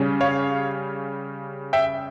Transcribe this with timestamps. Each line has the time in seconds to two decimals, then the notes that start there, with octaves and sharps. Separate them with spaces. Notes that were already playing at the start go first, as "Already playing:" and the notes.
Already playing: C#3 G3 C#4
0.21 C#5 F5
1.73 E5 G5